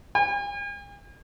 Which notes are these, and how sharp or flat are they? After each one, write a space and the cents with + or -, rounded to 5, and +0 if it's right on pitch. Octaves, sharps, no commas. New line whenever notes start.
G#5 -45